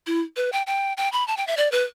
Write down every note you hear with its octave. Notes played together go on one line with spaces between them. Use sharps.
E4
B4
G5
G5
G5
B5
A5
G5
E5
D5
B4